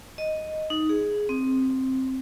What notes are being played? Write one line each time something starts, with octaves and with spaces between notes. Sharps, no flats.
D#5
D#4
G#4
C4